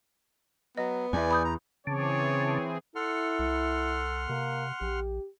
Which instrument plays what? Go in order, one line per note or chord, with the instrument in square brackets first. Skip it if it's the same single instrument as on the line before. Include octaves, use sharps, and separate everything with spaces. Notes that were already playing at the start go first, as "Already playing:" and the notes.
[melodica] F#3 [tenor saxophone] B3 [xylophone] D#5
[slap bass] E2 [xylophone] B4 E5 [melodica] D5 G#5
[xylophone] B5 D#6 G6
[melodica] A#5
[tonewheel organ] C#3 A5 D6 [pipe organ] E3 C4 G#4 [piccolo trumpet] C#5
[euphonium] E4 [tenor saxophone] A4 [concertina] F#5 C6 F6
[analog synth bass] C2
[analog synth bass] C3 [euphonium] A#3
[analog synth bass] A#1 [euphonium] G4